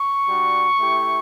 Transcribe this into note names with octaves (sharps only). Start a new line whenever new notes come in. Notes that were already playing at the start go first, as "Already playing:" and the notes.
Already playing: C#6
G3 D4 F#4
A3 E4 G4